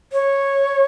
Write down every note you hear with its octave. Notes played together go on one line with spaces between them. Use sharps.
C#5